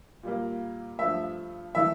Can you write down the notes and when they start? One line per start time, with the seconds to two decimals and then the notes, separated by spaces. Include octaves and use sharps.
0.23 A#2 G3 A#3
0.99 G2 F3 A3 E5
1.75 E3 A3 E5